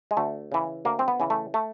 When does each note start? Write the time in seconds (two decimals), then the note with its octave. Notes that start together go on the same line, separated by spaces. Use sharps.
0.11 G#3
0.17 D2 A3
0.52 C#3 E3
0.85 D2 A#3
0.99 C4
1.08 B3
1.20 C#3 E3
1.30 A3
1.54 A3